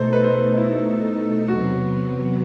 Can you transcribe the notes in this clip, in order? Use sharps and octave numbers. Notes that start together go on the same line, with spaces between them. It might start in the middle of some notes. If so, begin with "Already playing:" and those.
Already playing: B2 A3 D#4 A4 C5
B4
C5
B4
E4
E2 C3 F#3 B3 F#4